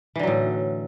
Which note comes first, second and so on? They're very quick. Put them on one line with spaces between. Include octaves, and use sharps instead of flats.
E3 D3 F#3 A2